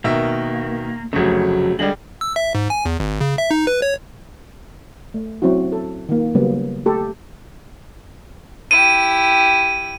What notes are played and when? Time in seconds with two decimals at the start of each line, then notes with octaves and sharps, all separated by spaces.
0.04 B2 D#3 A#3 E5
1.13 F1 C#3 F#3 A3
1.79 D3 G3 G#3 F#7
2.21 E6
2.36 E5
2.55 G#2
2.70 G#5
2.85 E2
3.00 G#1
3.21 C#3
3.38 E5
3.51 D#4
3.67 B4
3.82 C#5
5.14 A3
5.42 F#3 C4 C#4 E4 F#4
5.72 A4
6.09 D#3 A#3
6.35 C#3 F#3 G3 A#3 B3
6.86 A3 G4 A4
8.71 E4 G4 D#7